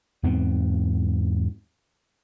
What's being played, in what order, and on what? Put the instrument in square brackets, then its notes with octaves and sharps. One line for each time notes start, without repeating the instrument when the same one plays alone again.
[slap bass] E2 G#2 B3 C4